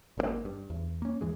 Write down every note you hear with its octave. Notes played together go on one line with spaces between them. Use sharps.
G#1 C3 A#3
G2
E2
A#3 C#4
E2 G#2 E3 G#3